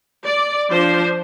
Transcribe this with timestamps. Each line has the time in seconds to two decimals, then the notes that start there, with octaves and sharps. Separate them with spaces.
0.25 D5
0.70 F3 D4 C5